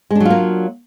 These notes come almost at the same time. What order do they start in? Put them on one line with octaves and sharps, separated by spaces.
G#3 D4 F#3 F4 A#3